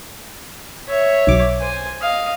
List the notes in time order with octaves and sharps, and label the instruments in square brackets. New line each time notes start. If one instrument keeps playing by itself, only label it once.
[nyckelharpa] C#5 E5
[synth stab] B1 D6
[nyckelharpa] C5 G#5
D#5 F5